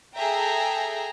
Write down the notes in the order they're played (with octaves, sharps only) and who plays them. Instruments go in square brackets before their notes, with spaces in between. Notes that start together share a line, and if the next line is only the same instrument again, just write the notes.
[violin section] G#4 A4 E5 G5 A#5